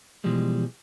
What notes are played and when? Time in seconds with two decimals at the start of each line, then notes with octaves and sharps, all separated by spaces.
0.24 B2 E3 F3 G3 G#3